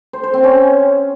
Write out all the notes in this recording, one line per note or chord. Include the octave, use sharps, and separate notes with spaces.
C5
C5
C4
C#4